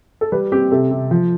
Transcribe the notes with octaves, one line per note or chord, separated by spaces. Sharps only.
A4
G3 B4
C4 G4
C3 A4
C3
F3